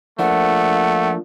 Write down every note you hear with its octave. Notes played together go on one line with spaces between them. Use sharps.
F3 A3 A#3 D4 F#5